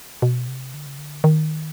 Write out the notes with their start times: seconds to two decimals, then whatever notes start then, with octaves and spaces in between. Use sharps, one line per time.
0.22 B2
0.48 C3
0.74 D3
0.86 C#3
0.98 D3
1.24 D#3